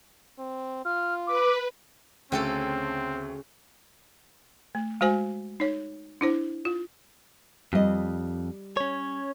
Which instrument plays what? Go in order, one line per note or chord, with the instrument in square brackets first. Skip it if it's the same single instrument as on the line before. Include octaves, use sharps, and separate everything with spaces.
[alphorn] C4
[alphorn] F4 [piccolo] F6
[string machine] B4 [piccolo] D6
[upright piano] D2 G5 [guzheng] C#3 C#4 A4 [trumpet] C4
[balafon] A3
G#3 F#4 C5 G#5
D#4 C#5
D4 E4 C5
F4
[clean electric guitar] F2 [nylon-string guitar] G3 D#5
[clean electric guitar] C#4 C#5